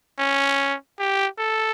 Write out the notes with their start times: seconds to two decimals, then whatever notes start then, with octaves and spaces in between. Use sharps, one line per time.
0.19 C#4
0.99 G4
1.39 A4